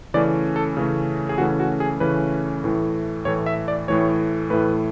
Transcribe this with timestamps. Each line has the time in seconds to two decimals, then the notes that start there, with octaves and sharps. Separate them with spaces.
0.14 C#3 E3 A3 C#4 D5
0.56 A4
0.77 C#3 E3 A3 C#4
1.29 G#4
1.38 C#3 E3 A3 C#4 F#4
1.60 F#4
1.80 G#4
2.00 C#3 E3 A3 C#4 B4
2.64 A2 E3 A3
3.25 A2 E3 A3 C#5
3.46 E5
3.68 D5
3.88 A2 E3 A3 C#5
4.50 A2 E3 A3 B4